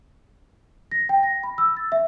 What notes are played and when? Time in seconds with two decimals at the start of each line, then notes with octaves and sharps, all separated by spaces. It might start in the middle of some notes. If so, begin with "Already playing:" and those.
0.91 A#6
1.09 G5
1.23 A#6
1.43 B5
1.58 E6
1.77 A6
1.92 E5